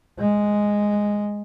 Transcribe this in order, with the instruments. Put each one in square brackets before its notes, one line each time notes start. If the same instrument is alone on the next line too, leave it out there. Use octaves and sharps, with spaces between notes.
[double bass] G#3